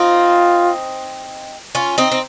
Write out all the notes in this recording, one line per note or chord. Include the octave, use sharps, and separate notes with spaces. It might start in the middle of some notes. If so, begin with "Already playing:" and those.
Already playing: C4 D#4 F4
C#4 F4
C4 D#4
C4